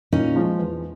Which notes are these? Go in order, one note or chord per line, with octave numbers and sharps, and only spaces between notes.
A#2 C#4 D#4
F3 G#3
E2